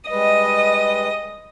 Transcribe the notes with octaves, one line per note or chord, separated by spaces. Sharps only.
G3 G#3 B4 D#5